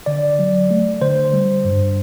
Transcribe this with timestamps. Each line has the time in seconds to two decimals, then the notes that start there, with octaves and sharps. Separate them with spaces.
0.06 D3 D5
0.39 F#3
0.71 A3
1.01 D3 C5
1.33 G3
1.65 G2